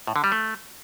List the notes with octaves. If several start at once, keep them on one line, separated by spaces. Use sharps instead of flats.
A2
D3
G3
A3